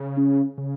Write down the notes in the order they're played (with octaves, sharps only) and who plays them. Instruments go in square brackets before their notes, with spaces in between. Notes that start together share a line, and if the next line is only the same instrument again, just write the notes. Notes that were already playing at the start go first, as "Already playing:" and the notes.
Already playing: [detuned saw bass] C#3
[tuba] C#4
[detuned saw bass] C#3